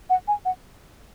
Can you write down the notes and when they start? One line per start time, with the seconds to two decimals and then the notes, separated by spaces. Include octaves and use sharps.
0.10 F#5
0.28 G#5
0.45 F#5